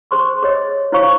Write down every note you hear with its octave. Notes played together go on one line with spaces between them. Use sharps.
G#4 C5 C6 C#6
G#4 C#5 D#5
E4 C5 C#5 F5 C#6